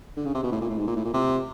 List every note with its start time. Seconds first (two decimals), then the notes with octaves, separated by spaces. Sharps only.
0.17 D3
0.25 C#3
0.35 C3
0.44 B2
0.52 A2
0.61 A#2
0.70 A2
0.78 G#2
0.87 A#2
0.96 A2
1.05 A#2
1.14 C3